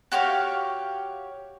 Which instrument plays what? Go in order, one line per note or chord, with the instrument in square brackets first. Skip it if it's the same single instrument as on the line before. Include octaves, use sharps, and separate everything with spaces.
[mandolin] F#4 G4 C#5 F5